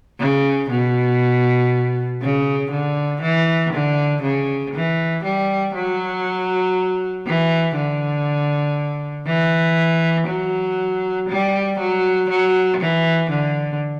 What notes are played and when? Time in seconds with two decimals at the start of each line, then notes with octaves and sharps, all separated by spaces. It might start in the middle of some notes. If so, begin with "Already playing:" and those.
0.20 C#3
0.70 B2
2.22 C#3
2.71 D3
3.22 E3
3.73 D3
4.22 C#3
4.74 E3
5.24 G3
5.74 F#3
7.26 E3
7.76 D3
9.27 E3
10.28 F#3
11.29 G3
11.79 F#3
12.29 F#3
12.80 E3
13.30 D3